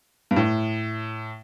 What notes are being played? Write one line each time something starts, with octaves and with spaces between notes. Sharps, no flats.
G2
A2